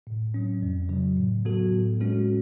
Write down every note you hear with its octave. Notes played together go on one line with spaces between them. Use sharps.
A2
F#3 C#4
F2
C#3 F#3
A2
F#3 B3 F#4 A4
A2
G#3 C#4 F#4 A4